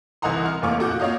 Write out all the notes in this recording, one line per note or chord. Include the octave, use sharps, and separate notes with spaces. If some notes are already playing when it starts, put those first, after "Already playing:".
C2 E3 D#5 F#5 A#5 C6
F6
F1 E2 A#3 C#6 D6
A#2 F#4 F#5 D6 G6
A#3 F4 C#5 D#5 F5